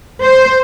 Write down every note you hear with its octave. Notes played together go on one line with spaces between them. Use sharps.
C5